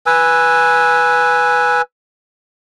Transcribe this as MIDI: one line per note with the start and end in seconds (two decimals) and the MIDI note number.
0.06 1.82 71
0.06 1.82 80
0.06 1.82 88